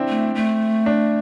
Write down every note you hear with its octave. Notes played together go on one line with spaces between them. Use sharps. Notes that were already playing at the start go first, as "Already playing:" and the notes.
Already playing: C4 D4 E4
A3
A3
D4